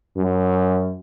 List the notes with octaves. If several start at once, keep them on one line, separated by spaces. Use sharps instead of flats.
F#2